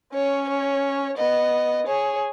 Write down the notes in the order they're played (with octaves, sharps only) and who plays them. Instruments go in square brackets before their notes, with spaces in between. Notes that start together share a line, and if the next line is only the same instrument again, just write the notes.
[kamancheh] C#4 [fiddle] C#5
[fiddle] C#5
[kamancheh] B3 [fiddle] D#5
[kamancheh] G#4 [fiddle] C#5